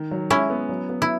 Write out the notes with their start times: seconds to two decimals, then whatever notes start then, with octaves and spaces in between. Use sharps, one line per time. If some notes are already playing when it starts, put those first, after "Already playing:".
Already playing: D#3
0.11 F#3
0.30 G#3 C#4 E4
0.50 B3
0.69 F#3
0.89 B3
1.02 E4